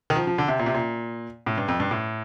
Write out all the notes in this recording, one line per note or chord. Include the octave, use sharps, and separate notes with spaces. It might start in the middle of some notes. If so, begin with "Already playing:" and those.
D#3
F3
F3
D3
C3
A#2
C3
A#2
A2
G2
F2
G2
A2